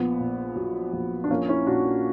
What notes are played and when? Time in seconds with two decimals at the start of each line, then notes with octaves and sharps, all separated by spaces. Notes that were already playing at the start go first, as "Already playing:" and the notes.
Already playing: A#1 B3
0.20 A#2
0.56 F#3
0.93 A#1
1.24 D4
1.31 A#1 A#3 C#4
1.48 C#4 E4
1.66 A#2 D4 F#4